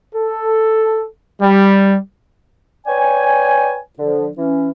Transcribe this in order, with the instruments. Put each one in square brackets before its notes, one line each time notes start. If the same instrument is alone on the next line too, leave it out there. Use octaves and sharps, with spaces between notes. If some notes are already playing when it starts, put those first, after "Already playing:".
[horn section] A4
G3
[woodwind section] B4 C#5 D5 G5 G#5
D3 F3
E3 C#4